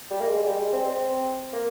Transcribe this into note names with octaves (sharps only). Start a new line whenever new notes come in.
G3
A#3
G#3
G#3
G3
G#3
C4
C4
A#3